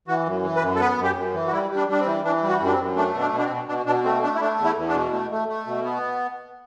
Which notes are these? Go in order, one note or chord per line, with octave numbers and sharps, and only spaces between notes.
E3 F#4
F#2
E3
B4
F#2
A4
B3 B4
F#2
G4
F#2
E3
F#4
G3 E4
G3
D4
G3 D4
C4
E3
E3 D4
G3
F#4
F#2
D4
C4
F#2
A3 D4
B2
D4
B2
D4
C4
B2
B2 D4
B2 D4
A3 C4
A3 D4
E4
A3 D4
E2
E4
E2
D4
B2
A3
A3
A3
B2
B3